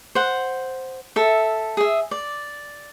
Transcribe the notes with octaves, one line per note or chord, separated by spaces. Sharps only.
C5 F#5
A4 E5
G#4 E5
D5